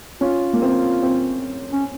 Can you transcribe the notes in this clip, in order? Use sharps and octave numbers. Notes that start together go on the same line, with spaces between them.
C#4 F4
A#3
C4
C4
C#4